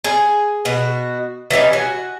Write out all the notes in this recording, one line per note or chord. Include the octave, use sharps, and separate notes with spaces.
G#4 G#5
B2 F#4
E3 G3 C#4 D#4
F#4 G#5